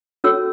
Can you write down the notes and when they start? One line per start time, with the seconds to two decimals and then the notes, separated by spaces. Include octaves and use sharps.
0.24 C#4 F#4 A4 C#5 E6